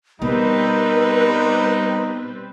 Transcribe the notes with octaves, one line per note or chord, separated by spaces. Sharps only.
B2 G3 C4 D#4 A#4 B4